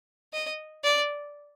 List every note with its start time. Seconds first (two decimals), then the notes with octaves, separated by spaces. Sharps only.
0.33 D#5
0.84 D5